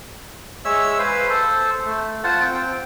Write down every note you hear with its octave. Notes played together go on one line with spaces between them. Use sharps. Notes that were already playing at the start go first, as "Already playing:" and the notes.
G#3 C#5 E5 E6
B4 C5 F5
A4 C5
A3
F4 C5 F#5 A5
C4 G5